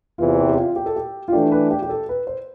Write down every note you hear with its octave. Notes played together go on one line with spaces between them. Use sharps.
E2 C3 E3 F4
G4
G4
F4
G4
A4
G4
F4
E3 A3 D4 G4
B4
G4
G4
A4
B4
C5